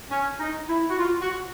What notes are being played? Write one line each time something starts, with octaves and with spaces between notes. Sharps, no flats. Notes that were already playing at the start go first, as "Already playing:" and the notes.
C#4
D#4
E4
F#4
F4
F#4